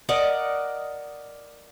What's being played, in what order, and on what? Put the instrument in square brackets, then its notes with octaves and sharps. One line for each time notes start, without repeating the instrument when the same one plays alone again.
[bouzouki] A#4 D5 D#5 F#5